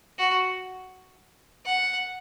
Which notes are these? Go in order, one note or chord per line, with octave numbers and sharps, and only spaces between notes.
F#4
F#5